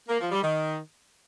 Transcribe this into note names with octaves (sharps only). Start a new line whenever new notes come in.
A#3
F3
G3
D#3